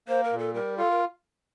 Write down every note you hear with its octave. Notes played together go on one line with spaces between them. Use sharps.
A#3 C5
A#4
A#2
A4
G3 A#4
F4 A4
A#4